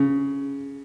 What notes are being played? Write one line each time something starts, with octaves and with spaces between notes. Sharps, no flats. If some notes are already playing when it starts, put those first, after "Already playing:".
Already playing: C#3